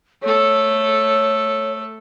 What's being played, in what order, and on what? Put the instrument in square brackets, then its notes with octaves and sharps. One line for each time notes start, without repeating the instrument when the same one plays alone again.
[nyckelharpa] A3 A4 [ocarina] C#5